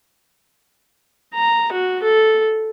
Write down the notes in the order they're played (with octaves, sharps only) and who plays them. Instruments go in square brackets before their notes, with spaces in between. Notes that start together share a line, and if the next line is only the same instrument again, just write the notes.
[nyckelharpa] A#5
F#4
A4